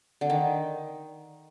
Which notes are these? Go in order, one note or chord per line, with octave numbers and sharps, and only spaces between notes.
D3
D#3